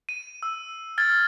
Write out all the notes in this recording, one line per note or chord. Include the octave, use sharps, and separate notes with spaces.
D#7
E6
F6 G#6 A6